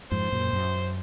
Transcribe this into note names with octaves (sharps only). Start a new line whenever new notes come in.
F2 G#2 C5
F#2 A#2
F#2